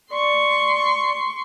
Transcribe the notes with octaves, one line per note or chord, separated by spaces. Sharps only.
D5 C6 C#6